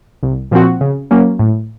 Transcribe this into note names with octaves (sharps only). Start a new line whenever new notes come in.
C2
A#2 F3 C4 F#4
C#3
F#3 A#3 C#4
A2